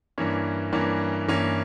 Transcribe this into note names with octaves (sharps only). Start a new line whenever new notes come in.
G2 E3 A#3 C#4
G2 E3 A#3 C#4
G2 E3 A#3 C#4